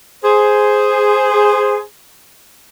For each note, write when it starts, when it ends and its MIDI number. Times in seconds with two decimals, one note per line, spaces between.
0.23 1.80 68
0.23 1.80 72